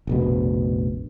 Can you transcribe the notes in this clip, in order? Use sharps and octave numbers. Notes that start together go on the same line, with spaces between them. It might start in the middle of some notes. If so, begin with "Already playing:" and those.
F1 A#1 B2